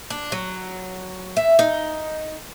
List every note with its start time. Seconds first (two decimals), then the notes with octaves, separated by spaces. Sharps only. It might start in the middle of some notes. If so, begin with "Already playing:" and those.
0.10 D4
0.32 F#3
1.37 E5
1.59 D#4